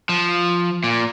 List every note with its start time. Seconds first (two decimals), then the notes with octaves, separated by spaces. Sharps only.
0.09 F3
0.84 A#2